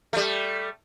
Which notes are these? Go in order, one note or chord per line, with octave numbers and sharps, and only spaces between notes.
G3 A3